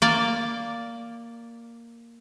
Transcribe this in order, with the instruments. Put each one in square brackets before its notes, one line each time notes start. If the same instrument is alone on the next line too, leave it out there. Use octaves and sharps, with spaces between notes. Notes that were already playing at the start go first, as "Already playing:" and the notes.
[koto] A#3 D5